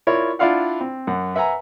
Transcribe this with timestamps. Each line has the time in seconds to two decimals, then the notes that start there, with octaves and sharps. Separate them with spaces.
0.07 E4 F4 A#4 C#5 D5
0.39 D4 E4 F4 D5 F5 F#5
0.80 C4
1.07 F#2 F#5
1.35 B4 E5 F#5 G#5 A#5